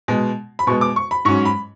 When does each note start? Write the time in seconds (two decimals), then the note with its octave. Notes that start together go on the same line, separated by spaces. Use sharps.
0.08 B2 G#3 B3
0.59 B5
0.67 B2 G#3 B3 C#6
0.81 D6
0.96 C#6
1.11 B5
1.25 G#2 F#3 C#4 C#6
1.45 B5